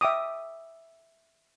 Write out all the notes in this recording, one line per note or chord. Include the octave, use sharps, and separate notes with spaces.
E5 G5 D6 D#6